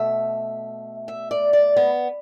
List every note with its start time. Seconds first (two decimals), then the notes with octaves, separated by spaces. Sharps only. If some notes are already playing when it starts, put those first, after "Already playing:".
Already playing: B2 A3 E5
1.08 E5
1.31 D5
1.53 D5
1.76 B3